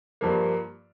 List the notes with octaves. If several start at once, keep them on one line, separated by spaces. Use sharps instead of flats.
G2 F3 A#3